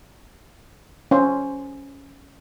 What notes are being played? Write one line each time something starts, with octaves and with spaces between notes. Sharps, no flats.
C#4 C5